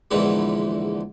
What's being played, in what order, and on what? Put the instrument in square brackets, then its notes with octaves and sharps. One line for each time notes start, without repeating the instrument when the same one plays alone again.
[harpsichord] A#1 E2 G#2 D3 E3 G#3